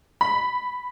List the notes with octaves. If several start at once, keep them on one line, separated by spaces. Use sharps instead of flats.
B5